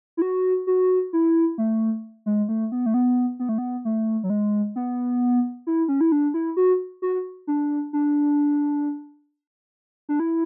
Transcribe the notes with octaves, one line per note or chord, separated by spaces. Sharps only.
E4
F#4
F#4
E4
A3
G#3
A3
B3
A3
B3
B3
A3
B3
A3
F#3
G#3
B3
E4
C#4
E4
D4
E4
F#4
F#4
D4
D4
D4
E4